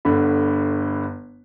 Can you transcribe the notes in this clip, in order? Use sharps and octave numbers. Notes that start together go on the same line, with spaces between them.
G1 D3 B5